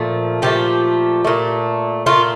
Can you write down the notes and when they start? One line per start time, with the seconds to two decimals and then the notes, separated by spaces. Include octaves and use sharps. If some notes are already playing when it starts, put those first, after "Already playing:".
Already playing: A#2 F3 A3
0.42 A#2 F3 A3 G4
1.25 A#2 A3
2.06 A#2 A3 F4